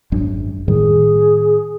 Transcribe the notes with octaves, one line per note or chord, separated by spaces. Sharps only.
G#1 F#2 D4
A2 D#3 G3 G#4